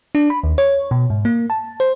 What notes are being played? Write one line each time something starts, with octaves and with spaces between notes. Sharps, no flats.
D4
B5
D#2
C#5
B2
G#2
A#3
A5
C5